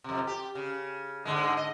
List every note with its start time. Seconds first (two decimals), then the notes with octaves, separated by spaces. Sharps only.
0.04 F2 C3
0.27 G4
0.55 C#3
1.25 G#2 D3 G#3
1.57 D#5